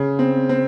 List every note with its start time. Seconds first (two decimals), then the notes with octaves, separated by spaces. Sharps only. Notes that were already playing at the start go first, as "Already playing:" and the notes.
Already playing: C#3
0.19 C4
0.49 C4